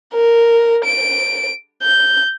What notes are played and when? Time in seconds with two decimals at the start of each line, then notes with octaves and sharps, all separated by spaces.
0.14 A#4
0.85 D7
1.83 G6